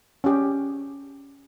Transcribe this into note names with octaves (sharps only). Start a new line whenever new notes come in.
C#4 G4